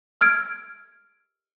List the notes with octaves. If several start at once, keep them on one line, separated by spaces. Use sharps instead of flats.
E6 F6 G#6 D7